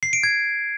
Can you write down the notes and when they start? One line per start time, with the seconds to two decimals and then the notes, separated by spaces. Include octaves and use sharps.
0.03 C7
0.13 D7
0.23 G#6